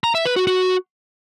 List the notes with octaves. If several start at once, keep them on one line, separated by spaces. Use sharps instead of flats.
A#5
E5
B4
F#4
F#4